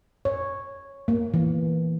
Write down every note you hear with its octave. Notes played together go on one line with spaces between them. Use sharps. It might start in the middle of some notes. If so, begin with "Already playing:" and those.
C#5
A#3
E3